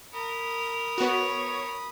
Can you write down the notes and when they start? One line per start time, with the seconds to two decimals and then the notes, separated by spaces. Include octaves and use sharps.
0.13 A#4 B5 D#6
0.98 B3 F#4 C#5